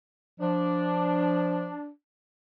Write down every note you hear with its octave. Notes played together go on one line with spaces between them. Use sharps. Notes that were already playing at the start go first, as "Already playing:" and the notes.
F3 D4